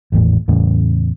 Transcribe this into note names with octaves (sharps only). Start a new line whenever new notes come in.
G#1 E2 A2
E2 A2 C#3